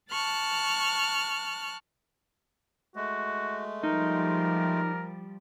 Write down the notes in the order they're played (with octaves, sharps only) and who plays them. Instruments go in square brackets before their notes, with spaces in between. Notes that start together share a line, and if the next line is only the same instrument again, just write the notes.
[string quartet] A5 C#6 F6 F#6
[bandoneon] G#3 A3 [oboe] F#4
[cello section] F3 G3 [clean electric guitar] D#4 [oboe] A#4